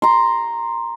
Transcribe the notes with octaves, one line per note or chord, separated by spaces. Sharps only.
A#5 C6